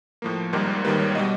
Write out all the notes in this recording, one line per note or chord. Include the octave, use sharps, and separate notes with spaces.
A2 F3 A#3
G#1 G#2 D#3 G3 A#3 A#4
G#1 G#2 D#3 G3 A#3 B4
C#5
B2 G3 D#5